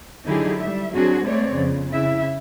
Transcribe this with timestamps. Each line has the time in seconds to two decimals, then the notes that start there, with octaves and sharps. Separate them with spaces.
0.25 D3 F#3 D#4 E4 G4 G#4
0.61 G3 E5
0.94 F#3 C4 D4 F#4 G#4
1.24 G#3 A3 B3 C4 C#5 D5
1.53 F2 C#3
1.91 C#3 E4 E5